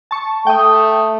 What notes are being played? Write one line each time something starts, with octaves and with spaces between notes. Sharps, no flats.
A5 C#6
A3 G5 D#6